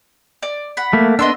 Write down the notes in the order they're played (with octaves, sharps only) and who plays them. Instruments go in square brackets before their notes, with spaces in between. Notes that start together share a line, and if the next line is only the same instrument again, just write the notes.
[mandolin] D5
F#5 B5
[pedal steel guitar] A3 A#3
[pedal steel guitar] B3 D4 [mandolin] D#5 C6 E6